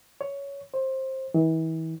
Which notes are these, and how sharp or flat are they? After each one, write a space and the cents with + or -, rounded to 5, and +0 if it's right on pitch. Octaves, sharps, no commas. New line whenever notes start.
C#5 +10
C5 +20
E3 -35